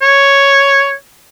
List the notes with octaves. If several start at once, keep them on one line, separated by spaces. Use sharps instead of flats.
C#5